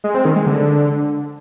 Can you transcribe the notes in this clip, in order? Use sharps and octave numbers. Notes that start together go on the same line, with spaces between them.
G#3
C4
D#3
G#3
D3